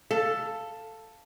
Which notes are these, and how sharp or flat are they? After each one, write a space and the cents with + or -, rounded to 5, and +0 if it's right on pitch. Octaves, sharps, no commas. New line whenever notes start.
A4 +5 F5 +0